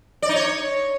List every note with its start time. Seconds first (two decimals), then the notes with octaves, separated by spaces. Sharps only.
0.22 D5
0.29 D#4
0.36 C#5